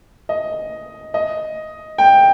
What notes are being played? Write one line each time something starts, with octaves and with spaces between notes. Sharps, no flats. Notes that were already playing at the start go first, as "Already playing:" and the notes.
D#5
D#5
G5